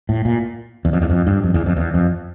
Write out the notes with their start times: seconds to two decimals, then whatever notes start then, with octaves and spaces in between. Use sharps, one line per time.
0.09 A2
0.25 A#2
0.85 E2
0.93 F2
1.02 E2
1.10 F2
1.27 G2
1.43 F2
1.54 E2
1.66 F2
1.77 E2
1.94 F2